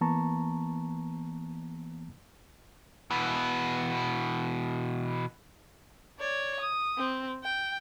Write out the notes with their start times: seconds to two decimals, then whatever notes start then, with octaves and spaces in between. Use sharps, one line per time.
0.01 E3 A#3 B3 A5 A#5 C#6
3.11 B2 E3
6.19 C#5 D5
6.60 D#6
6.97 C4
7.44 G5